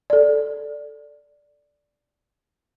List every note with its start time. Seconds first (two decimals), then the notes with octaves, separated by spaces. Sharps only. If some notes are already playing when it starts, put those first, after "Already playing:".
0.10 A4 D5